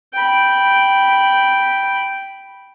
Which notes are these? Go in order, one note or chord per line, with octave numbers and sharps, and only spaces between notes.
G5 B5